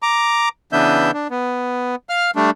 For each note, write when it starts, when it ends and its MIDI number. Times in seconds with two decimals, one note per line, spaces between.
0.03 0.49 82
0.03 0.49 86
0.72 1.11 49
0.72 1.11 52
0.72 1.11 59
0.72 1.11 62
0.72 1.11 76
0.72 1.11 91
1.13 1.27 62
1.31 1.95 59
2.09 2.31 77
2.09 2.31 89
2.36 2.50 55
2.36 2.50 57
2.36 2.50 62